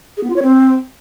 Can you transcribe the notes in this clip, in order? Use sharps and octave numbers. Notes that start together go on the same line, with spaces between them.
G#4
B3
F4
C#5
C4